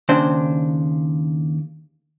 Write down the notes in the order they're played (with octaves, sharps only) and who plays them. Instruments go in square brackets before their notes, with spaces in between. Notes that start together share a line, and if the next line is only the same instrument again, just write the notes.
[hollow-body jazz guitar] D#2 C#3 D4 C5